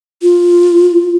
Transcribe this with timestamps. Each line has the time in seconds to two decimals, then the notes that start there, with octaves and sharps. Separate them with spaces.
0.22 F4